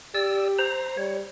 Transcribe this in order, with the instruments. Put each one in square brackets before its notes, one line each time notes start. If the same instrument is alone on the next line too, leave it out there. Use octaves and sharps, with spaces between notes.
[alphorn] G4 [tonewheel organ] D5 E6
[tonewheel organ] C5 A#5
[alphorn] G3 [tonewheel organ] C#5